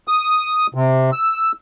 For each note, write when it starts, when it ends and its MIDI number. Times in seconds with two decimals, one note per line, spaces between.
0.08 0.67 87
0.74 1.11 48
1.13 1.52 88